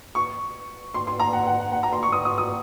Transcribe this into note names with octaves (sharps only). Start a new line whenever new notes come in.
C#6
C6
C6
A#5
F#5
F#5
F#5
F#5
A#5
C6
C#6
D#6
D#6
D#6